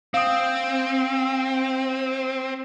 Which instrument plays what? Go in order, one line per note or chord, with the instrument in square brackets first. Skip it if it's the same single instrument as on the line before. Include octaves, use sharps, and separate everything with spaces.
[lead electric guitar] C4 [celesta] F5 D#6